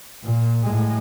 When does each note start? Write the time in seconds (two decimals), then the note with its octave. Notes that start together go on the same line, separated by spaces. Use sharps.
0.24 A#2
0.63 A2 G#3